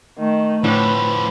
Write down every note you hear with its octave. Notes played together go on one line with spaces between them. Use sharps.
D#3 A3
A2 D3 F3 G4 B4